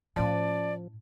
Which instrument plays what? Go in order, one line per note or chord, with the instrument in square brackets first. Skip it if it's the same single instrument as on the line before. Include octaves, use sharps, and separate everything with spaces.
[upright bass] A2 E4 [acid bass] F3 [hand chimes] C#4 A5 [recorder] D5